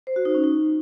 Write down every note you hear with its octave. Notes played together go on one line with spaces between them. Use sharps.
C5
F#4
D#4
C#4
D#4